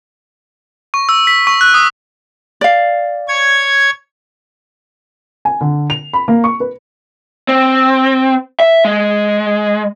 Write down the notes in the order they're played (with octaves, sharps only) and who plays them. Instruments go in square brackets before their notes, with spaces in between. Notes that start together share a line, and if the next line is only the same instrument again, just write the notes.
[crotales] C#6
E6
B6
C#6
F#6
D#6
[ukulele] D5 F5
[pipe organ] C#5 G#6
[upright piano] G#5
D3
F7
B5
A#3
C#6
B4
[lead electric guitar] C4
E5
G#3